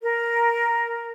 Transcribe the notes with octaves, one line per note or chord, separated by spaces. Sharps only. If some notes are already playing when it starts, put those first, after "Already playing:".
A#4